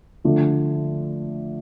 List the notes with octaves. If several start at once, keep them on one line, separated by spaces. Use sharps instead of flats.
D3 F3 A3